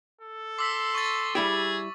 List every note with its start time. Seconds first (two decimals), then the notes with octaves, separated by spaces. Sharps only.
0.21 A4
0.59 C6 D6 E6 B6
0.95 C#6 A6
1.35 G3 E4 G4 G#4